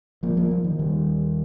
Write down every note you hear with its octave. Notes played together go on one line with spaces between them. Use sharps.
F3 A#3
F3 A#3
F3
D#3
D#3 G3
D#2